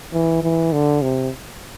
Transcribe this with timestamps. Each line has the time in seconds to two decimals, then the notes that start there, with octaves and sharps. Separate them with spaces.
0.13 E3
0.43 E3
0.72 D3
1.02 C3